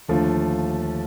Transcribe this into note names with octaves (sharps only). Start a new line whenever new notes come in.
D#2 D3 F3 A3